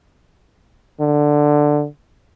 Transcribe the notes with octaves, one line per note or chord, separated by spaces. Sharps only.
D3